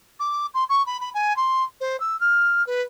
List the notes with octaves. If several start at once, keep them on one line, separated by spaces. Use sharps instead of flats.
D6
C6
C#6
B5
B5
G#5
C6
C5
E6
F6
B4